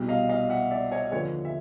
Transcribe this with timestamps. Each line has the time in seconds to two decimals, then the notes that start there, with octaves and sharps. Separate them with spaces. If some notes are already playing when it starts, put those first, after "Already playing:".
Already playing: C2 B2
0.08 D#5 F5
0.29 D#5 F5
0.50 E5 F#5
0.71 D5 E5
0.91 C#5 D#5
1.12 D#2 D3 F3 B4 C#5
1.45 E5